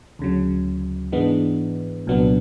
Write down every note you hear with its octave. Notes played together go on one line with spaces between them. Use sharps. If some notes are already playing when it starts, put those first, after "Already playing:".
D2 C#3 F#3
G#2 E3 G#3 B3 D4
C2 A#2 F#3 B3 D4